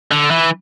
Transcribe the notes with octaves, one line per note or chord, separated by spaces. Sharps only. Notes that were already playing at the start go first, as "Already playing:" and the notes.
D3
E3